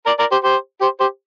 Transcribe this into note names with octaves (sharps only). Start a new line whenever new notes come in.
A#4 D5
A#4 D5
G4 C5
G4 C5
G4 C5
G4 C5